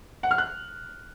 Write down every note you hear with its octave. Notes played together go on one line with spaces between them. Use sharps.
F#5
F6
F#6